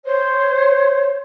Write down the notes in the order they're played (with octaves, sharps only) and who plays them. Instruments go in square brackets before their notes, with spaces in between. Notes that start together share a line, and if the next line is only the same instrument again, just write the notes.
[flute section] C5 C#5